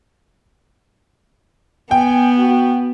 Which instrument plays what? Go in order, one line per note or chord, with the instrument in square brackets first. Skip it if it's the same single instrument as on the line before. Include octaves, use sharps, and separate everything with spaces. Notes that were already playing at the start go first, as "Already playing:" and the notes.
[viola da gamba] B3 [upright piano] G5 [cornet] G#5
[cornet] F#4